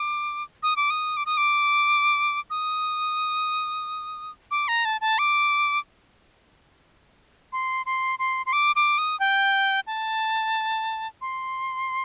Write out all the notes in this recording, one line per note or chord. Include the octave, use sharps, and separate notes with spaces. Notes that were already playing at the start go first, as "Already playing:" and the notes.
Already playing: D6
D#6
D6
D#6
D6
D#6
D6
D#6
D6
A#5
A5
A5
D6
C6
C6
C6
C6
D6
D6
D#6
G5
A5
C6